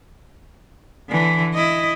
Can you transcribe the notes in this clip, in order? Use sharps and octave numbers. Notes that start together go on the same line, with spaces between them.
D3 E3
E4 D#5